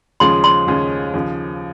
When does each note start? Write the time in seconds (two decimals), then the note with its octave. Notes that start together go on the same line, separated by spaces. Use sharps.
0.20 D#2 C#3 F3 G#3 C#4 C6
0.44 C6
0.67 D#2 C#3 F3 G#3 C#4
1.14 D#2 C#3 F3